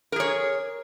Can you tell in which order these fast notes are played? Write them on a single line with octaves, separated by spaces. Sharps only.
A#4 G#4 C#5